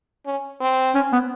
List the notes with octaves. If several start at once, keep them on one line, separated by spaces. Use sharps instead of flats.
C#4
C4
C#4
B3